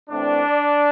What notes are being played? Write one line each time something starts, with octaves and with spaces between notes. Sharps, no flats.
A2 E3 A3 C4 D4